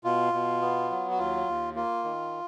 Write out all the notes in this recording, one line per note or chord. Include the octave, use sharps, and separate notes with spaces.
B2 F4
B2
B3
F#3
F#4
D#2 F4
D#2
A#3 F4
D#3